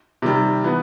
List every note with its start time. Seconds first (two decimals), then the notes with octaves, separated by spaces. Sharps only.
0.22 C3 D#3 G3
0.64 E3 B3